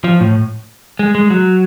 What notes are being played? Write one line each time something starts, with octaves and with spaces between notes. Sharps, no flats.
F3
A2
G#3
G#3
F#3